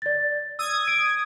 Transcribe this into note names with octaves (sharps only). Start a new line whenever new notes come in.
D5 A6
D#6 E6 G#6
D7